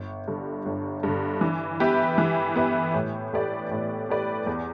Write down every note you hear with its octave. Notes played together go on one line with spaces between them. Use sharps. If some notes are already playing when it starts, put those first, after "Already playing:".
Already playing: G1
G2 D3
G1
G2 D3
E3
B3 G4 B4 E5
E3
B3 G4 B4 E5
A2
A3 G4 B4 D5
A2
A3 G4 B4 D5
E2